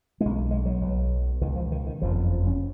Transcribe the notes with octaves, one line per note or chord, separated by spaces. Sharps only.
B1 B2 G#3
G#3
F#3
B1 B2
C#2 B2 D#3
F3
D#3
D#3
F#1 F2 C#3 F3
F3
C#4